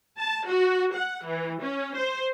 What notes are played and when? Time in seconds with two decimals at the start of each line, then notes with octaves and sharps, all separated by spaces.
0.18 A5
0.48 F#4
0.95 F#5
1.26 E3
1.61 C#4
1.97 C5